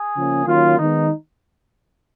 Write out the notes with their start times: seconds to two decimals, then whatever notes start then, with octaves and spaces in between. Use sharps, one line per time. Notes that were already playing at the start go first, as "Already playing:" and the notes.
Already playing: G#4
0.16 C#3 F3 A#3 C#4
0.46 D#3 F#3 A#3 C#4 F4
0.78 D#3 G#3 B3 D#4